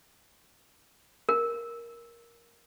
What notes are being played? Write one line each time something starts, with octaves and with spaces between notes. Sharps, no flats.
A#4